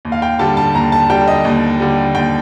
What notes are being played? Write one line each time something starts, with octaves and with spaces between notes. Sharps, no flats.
D#2
F5
G5
D3 G3 A5
A5
D#2 A#5
A5
D3 G3 G5
D#5
D#2
D3 G3
D#2 G5